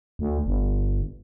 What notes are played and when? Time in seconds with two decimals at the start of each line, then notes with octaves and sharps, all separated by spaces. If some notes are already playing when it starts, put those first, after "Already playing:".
0.19 D2
0.46 G1